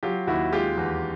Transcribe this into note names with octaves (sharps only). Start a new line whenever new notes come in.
F#3 F4 G4
D#2 E4 F#4
G#3 F4 G4
E2